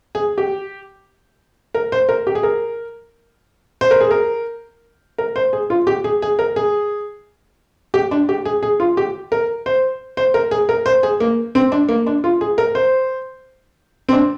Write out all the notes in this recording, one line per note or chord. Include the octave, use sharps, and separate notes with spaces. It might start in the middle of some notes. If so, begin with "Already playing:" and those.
G#4
G4
A#4
C5
A#4
G4
G#4
A#4
C5
A#4
G#4
A#4
A#4
C5
G#4
F4
G4
G#4
G#4
A#4
G#4
G4
D4
G4
G#4
G#4
F4
G4
A#4
C5
C5
A#4
G#4
A#4
C5
G#4
A#3
C4
D4
A#3
D4
F4
G#4
A#4
C5
C4
D4